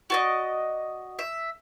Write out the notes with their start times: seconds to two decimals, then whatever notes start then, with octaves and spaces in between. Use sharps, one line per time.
0.10 F#4 D5 D#5
1.19 E5